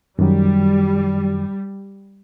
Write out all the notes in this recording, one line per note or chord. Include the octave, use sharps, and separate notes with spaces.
F#2 D#3 F#3 G3